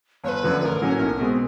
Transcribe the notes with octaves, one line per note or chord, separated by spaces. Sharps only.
G1 B4 C#5
F#2 D3 F3 A3
A1 A#4 B4
A2 F#3 A#3 C#4
B1
B2 G#3 C4